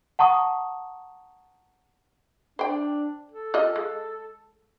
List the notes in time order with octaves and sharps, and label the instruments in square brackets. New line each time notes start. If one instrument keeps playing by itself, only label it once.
[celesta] F#5 A5 A#5 C#6 D#6
[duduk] D4 [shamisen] C5 G5
[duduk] A4
[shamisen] F4 G4 D#5
G#3